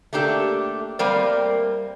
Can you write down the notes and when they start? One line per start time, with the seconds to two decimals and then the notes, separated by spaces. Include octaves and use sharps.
0.13 A3 A#3 D4 G4 A4
0.99 G3 A3 A#3 C4 A#4 D5